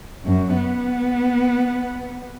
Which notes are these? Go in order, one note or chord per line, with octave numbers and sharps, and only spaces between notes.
F#2
B3